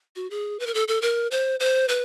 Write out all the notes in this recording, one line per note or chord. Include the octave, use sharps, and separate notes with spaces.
F#4
G#4
B4
A#4
A4
A4
A#4
C5
C5
B4